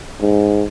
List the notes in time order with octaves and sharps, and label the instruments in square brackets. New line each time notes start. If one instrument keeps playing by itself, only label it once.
[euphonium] G#2